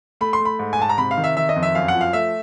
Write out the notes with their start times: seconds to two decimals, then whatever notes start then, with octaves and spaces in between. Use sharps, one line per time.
0.21 A3 B5
0.33 C6
0.40 A3
0.45 B5
0.59 G#2
0.73 G#5
0.79 G#2 A5
0.89 A#5
0.98 C3 B5
1.11 F5
1.17 D#3
1.24 E5
1.37 D#3 E5
1.49 D#5
1.56 F2
1.63 E5
1.75 F#2 F5
1.88 F#5
1.94 F3
2.01 F5
2.13 A3 E5